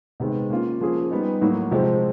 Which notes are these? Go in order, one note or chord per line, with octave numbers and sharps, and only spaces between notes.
C3 D#3 G#3 B3
A#3 C#4 F4
F3 A#3 C#4 F4 G#4
G3 B3 D#4
A2 F#3 A#3
C3 F3 G#3 C4